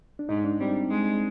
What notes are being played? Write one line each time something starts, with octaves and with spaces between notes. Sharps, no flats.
D4
G#2 D#4
D4
G3 C4
G#3